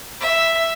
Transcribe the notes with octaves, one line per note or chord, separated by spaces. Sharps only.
E5